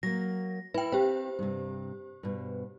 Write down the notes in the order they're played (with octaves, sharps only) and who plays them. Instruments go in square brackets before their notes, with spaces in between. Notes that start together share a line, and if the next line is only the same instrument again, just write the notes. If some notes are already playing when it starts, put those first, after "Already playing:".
[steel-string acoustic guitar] F#3 A#3 [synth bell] A#6
[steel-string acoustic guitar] E4 [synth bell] B4 G5
[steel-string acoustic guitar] C4 [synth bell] G4 C5
[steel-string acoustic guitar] G2 C3
G2 B2